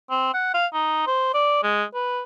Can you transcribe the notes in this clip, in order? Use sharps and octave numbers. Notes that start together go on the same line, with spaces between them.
C4
F#5
F5
D#4
C5
D5
G#3
B4